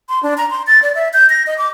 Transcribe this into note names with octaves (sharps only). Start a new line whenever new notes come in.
C6
D4
A#5
C6
A6
D5
E5
G6
A#6
D#5
D6